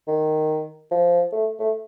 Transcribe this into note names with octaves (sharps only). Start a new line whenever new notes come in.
D#3
F3
A3
A3